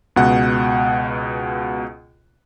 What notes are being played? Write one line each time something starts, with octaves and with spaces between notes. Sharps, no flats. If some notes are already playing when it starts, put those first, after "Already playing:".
C#2 B2 F#5